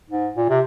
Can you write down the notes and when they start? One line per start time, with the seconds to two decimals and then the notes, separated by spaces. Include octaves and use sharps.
0.10 G#2
0.36 A#2
0.50 C3